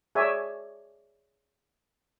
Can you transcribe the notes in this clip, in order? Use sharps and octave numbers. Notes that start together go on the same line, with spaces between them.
G#4 C#5 D5 E5 G#5